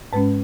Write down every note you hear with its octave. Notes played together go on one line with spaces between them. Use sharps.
G#2 G#3 C#4 B4